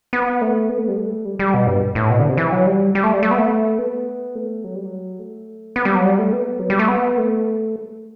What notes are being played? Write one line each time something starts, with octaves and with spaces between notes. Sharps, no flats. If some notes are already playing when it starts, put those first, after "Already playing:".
B3
A3
B3
A3
G3
A3
G3
G3
B2
G2
A2
B2
D3
C3
E3
F#3
G3
G3
A3
G3
A3
B3
A3
B3
A3
F#3
G3
F#3
A3
B3
G3
F#3
G3
A3
B3
F#3
G3
A3
B3
A3